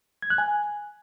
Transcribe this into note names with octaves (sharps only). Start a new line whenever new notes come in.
G#6
F#6
G#5